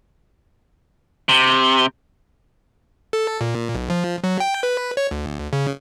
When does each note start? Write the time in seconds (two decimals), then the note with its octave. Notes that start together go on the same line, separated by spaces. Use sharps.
1.29 C3
3.13 A4
3.41 A#2
3.75 B1
3.90 F3
4.24 F#3
4.40 G5
4.63 B4
4.97 C#5
5.11 D2
5.53 C#3